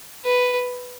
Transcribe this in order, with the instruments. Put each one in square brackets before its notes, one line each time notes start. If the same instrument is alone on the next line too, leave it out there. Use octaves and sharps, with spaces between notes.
[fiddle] B4